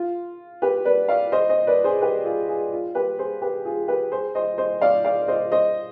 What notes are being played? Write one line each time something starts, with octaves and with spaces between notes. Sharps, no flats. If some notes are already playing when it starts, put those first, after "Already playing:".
Already playing: F4
G4 B4
B4 D5
D5 F5
C5 D#5
C5 D#5
B4 D5
G#4 C5
G4 B4
F4 G#4
F4 G#4
F4
G4 B4
G#4 C5
G4 B4
F4 G#4
G4 B4
G#4 C5
C5 D#5
C5 D#5
D5 F5
D5 F5
C5 D#5
C5 D#5